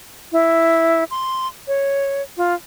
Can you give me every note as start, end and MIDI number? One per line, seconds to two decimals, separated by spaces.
0.32 1.04 64
1.11 1.47 84
1.68 2.22 73
2.37 2.54 65